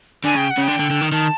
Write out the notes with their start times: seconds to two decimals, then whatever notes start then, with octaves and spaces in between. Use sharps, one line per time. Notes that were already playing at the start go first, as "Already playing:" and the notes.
0.25 D3 G#5
0.36 C#3 G5
0.51 F#5
0.58 C#3
0.63 G5
0.68 D3
0.79 D3
0.90 D3
1.01 D#3
1.12 D#3 A5